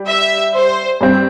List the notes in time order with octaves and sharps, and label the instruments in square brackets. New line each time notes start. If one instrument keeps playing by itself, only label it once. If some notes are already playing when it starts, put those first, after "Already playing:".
Already playing: [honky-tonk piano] G3
[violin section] E5
C5
[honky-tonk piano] G2 G3 C4